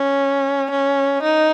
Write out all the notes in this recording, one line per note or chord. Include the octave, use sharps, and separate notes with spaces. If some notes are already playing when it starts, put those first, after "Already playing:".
Already playing: C#4
C#4
D#4